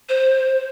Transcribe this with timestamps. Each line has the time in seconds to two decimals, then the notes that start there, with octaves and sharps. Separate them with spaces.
0.09 C5